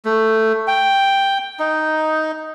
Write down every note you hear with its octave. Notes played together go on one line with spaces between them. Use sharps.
A3
G5
D#4